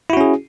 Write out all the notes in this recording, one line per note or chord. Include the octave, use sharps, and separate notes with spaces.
C#4 E4 F#4 G#4